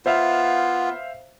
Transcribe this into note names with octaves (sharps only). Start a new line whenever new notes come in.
B3 F4 C5 E5 F5